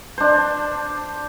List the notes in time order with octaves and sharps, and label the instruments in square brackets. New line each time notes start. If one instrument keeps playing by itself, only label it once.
[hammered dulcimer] D4 C5